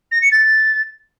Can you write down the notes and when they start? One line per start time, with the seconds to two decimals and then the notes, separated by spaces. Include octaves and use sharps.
0.11 A#6
0.21 C#7
0.31 A6